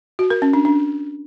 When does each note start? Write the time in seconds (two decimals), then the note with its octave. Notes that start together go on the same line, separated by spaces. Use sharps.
0.19 F#4
0.30 A#4
0.42 C#4
0.53 D4
0.65 D4